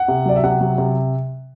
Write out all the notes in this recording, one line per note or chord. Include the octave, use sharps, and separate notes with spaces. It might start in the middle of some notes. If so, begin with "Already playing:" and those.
Already playing: F#5
C3
F#3 D5
E5
C3 F#5
F#3
C3